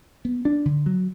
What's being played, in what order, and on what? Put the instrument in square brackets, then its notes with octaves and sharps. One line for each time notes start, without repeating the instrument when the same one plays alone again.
[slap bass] B3
D4
D3
F#3